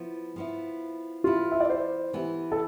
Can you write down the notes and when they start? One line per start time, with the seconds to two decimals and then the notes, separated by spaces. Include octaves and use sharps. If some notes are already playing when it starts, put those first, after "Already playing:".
Already playing: F3 B3 E4
0.36 F3 B3 E4
1.24 E3 B3 E4 F4
1.52 E5
1.60 D5
1.70 C5
2.13 E3 B3 E4 G4
2.52 A4